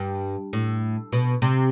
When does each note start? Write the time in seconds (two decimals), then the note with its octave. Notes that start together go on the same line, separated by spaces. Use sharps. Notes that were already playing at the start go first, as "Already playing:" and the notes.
Already playing: G2
0.53 A2
1.13 B2
1.42 C3